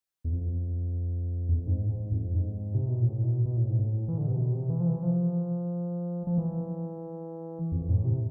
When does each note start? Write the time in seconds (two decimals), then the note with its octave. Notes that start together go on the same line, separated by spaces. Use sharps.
0.24 E2
0.32 F2
1.49 E2
1.57 F2
1.67 G#2
1.89 G#2
2.12 F2
2.35 G#2
2.74 C3
2.88 B2
3.02 A2
3.24 B2
3.45 B2
3.57 A2
3.68 G#2
3.79 A2
4.08 E3
4.18 D3
4.27 C3
4.35 B2
4.52 C3
4.70 E3
4.80 F3
4.87 E3
5.03 F3
6.27 F3
6.38 E3
7.72 F2
7.89 A2
8.05 C3